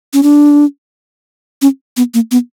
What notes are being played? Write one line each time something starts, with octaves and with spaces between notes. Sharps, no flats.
C#4
D4
C#4
B3
A#3
B3